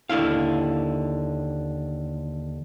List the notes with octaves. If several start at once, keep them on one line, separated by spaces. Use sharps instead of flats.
D#2 D3 E4 F5